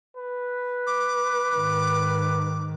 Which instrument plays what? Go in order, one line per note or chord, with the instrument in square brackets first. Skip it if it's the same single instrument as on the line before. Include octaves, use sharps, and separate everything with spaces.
[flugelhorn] B4
[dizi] D6
[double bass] G#2 D#3